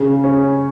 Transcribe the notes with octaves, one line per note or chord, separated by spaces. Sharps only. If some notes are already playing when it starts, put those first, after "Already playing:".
Already playing: C#3
C#4